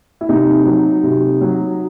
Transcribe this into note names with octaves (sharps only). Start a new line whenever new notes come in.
E4
C3 D#4
F#3
C3
F#3